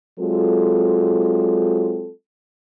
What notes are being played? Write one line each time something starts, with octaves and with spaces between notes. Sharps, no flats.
F#3 G#3 C4 F4 A4